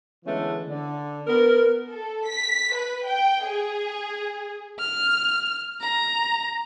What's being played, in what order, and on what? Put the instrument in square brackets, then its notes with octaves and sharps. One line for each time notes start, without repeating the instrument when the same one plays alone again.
[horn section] D3 E3 G#3 A3 B3 C#4
D3
B3 A#4
[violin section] A4
B6
B4
G5
G#4
[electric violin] F6
A#5